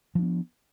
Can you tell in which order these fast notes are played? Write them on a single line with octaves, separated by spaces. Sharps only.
F3 D4 B3